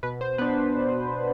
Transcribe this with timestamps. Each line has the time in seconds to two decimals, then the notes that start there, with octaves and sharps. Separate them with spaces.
0.03 B2 B4
0.21 C5
0.38 B3 D4 B4